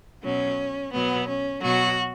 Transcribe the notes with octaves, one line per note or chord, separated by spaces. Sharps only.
B2 F#3 C#4
B2 F#3 B3
C#4
B2 F#3 F#4